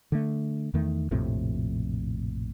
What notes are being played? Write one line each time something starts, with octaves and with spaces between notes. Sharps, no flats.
D3 A3
E2 D#3 A3
A#1 F2 A2 C3